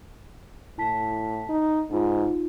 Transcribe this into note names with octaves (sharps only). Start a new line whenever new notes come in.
A2 E4 A5 B6
D#4
G#2 D#4 F4